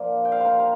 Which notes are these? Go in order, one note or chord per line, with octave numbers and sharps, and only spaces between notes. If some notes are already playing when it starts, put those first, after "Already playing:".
Already playing: A#2 F3 A#3 D4
G5
F5
A#4 C5
A#4